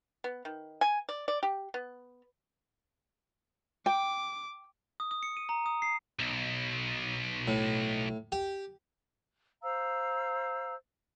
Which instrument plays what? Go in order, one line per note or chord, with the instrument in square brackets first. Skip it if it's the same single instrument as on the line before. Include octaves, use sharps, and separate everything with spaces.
[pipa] B3
D#3
G#5
D5
D5
G4
B3
[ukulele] G5 [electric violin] D6
[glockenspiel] D#6
D#6
C#7
D#7
A#5
D#6
C7
[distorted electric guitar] B1
[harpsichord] A2
G4
[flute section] C5 F5 A#5 E6